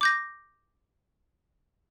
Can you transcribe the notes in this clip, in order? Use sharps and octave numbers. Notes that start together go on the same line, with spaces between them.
D6 G6 A#6